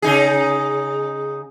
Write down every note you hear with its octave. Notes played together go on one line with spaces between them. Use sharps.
C#3 D#4 G#4